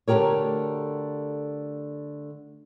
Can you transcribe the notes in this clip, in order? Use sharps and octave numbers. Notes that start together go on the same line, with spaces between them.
D3 A3 F#4 G4 A#4 C#5